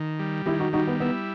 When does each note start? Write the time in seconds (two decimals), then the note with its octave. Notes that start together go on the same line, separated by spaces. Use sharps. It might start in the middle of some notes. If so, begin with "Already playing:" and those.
Already playing: D#3
0.19 G3
0.46 D#3 E4 G4
0.60 D#4 F#4
0.73 G3 D#4 F#4
0.87 B3
1.00 B3 E4